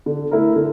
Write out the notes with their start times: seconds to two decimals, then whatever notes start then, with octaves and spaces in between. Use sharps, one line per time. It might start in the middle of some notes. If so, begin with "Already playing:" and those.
0.06 D3
0.31 A3 E4 A#4
0.56 D3